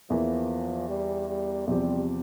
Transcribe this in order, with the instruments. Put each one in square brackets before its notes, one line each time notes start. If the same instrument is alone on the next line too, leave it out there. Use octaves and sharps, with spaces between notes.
[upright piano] E2 E3 A#3 [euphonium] F3
[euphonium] G3
G3
[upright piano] E2 C3 F3 C4 G4 [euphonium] G3